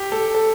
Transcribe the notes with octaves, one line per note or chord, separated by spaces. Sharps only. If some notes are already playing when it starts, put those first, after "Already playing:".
Already playing: G4
A4
A4